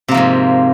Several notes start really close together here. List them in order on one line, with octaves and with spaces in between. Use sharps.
C3 A#3 F3 G#2